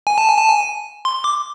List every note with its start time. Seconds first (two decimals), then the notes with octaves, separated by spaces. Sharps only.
0.07 G#5
0.18 A5
0.28 G#5
0.38 A5
0.49 G#5
1.05 C6
1.24 D6